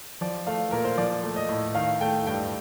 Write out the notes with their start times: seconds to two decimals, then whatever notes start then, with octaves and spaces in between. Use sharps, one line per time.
0.21 F3 D5
0.47 A3 F5
0.71 A#2 A#4
0.84 C5
0.97 F3 D5
1.23 A3
1.36 D#5
1.49 A2
1.75 D#3 F5
2.01 A3 G5
2.26 G2 G5